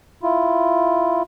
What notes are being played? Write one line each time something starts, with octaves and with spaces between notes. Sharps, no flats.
E4 F4